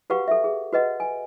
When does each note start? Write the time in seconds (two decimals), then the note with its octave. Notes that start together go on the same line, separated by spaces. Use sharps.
0.10 F#4 G4 B4 F5 F#5 C#6
0.28 A4 E5
0.44 G#4
0.72 F#4 B4 D#5 F#5
1.00 G#5